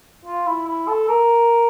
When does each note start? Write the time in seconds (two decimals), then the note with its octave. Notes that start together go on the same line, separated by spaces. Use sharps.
0.25 F4
0.47 E4
0.67 E4
0.88 A4
1.08 A#4